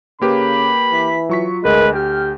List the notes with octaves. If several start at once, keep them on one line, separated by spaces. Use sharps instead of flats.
C#3 A#3 G4 B4 B5
E3 B6
F#3 F4 C#6 B6
D2 G#3 A#4 B4
G4 G5 F6